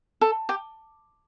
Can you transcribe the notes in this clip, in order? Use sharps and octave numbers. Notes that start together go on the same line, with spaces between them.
A4
G4